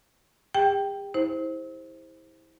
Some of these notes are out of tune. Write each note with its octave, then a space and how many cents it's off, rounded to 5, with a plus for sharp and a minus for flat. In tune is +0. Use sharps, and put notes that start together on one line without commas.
G4 +45 G5 +0
E4 -25 C5 +10